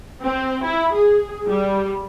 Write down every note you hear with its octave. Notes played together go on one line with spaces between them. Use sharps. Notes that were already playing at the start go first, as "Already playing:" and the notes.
C4
E4
G#4
G3